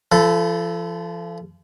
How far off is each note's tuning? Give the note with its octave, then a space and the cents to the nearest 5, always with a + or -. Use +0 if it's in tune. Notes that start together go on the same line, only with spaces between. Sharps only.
F3 -35 A4 -5 B5 +0